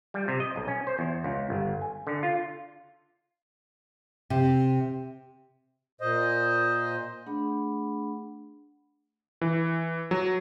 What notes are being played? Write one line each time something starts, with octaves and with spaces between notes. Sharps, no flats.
G3
C3
D#5
B1
C#4
C5
E2
C#2
G1
G#5
D3
F4
C3
A#2 C5 D#5
A3 D4 G#4 F#5 B5
E3
F#3